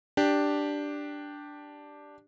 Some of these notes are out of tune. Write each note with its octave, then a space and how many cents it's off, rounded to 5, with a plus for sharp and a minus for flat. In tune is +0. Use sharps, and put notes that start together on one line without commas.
D4 +0 G4 +0